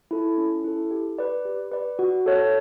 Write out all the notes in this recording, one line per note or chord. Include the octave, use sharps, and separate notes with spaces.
E4 A4
C#4
E4 A4
G4
B4 D5
G4
B4 D5
F#4
A4 C#5